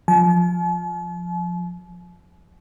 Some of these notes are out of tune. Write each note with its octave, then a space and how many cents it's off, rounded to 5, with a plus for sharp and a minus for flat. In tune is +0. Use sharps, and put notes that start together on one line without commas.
F3 +15 A5 -45